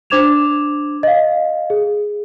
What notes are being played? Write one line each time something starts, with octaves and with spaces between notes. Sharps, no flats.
D4 C5 D6 G#6 E7 F7
D#5 F5
G#4